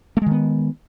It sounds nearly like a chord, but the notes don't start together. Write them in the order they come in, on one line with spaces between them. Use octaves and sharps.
A3 G#3 D#3 B3